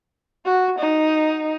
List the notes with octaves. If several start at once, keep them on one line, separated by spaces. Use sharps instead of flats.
F#4
D#4